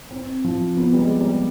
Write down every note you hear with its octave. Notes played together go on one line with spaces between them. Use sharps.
C4
F3
B3
G3
G#3
G3